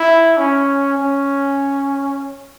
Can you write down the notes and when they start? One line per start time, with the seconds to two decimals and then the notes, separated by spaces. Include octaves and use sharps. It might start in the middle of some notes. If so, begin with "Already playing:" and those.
Already playing: E4
0.37 C#4
0.97 C#4